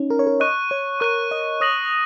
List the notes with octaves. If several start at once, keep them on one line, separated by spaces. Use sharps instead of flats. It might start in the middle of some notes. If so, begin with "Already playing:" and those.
Already playing: C#4 D#4
A#4
C#5
A#4
D#5 C#6 F#6 D#7
C#5
A#4 C#6 F#6 D#7
D#5
C#5 D#6 A#6 F#7